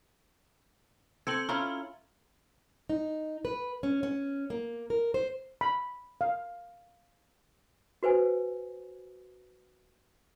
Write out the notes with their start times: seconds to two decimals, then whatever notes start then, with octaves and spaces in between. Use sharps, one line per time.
1.27 C4 A4 G#6 C#7 F#7
1.49 C#4 E4 F4 A#5
2.90 D#4
3.45 B4
3.83 C#4
4.03 C#4
4.50 A#3
4.90 A#4
5.14 C5
5.61 B5
6.21 F5
8.03 F#4 B4 C5 G#5